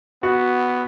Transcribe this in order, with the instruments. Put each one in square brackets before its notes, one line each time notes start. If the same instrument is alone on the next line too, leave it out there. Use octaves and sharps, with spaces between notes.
[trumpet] B3 [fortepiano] F#4